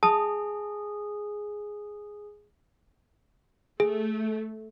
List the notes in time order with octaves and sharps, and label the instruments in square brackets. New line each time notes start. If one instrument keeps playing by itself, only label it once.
[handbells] G#4 [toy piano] A5 D#6
[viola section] A3 [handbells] G#4